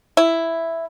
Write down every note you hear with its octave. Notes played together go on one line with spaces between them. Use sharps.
E4